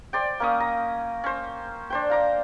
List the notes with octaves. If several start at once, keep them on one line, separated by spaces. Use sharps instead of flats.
C5 D5 G5
A#3 C#4 D#6
A#5
C#4 C5
D4 C5 G5
F5 A#5 D6